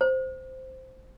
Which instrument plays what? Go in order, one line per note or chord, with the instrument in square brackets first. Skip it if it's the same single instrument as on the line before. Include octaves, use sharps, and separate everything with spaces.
[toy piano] C5